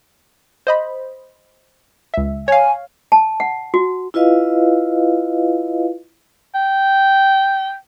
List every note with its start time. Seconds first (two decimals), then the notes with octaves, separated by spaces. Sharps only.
0.67 C5 D#5 B5
2.14 C#2 E5
2.48 C#5 F5 G#5
3.12 A5
3.40 F#5
3.74 F#4
4.14 E4 F4 B4 D#5 F5
6.55 G5